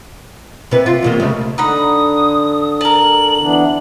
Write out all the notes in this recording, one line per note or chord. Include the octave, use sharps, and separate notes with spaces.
C3 B4
F4
E2 C3 A#3
C#3 G#3 A3
D3 D#4 F#5 B5 D#6
A#4 A5 F#7
E3 B3 D4